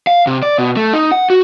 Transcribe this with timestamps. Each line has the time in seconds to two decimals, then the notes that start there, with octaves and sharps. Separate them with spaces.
0.07 F5
0.27 C3
0.43 D5
0.58 B2
0.76 A3
0.93 D#4
1.12 F#5
1.30 F#4